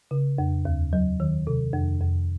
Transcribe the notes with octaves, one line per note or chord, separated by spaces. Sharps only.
C#3
F2
D#2
F#3
D#3
C3
F2
F2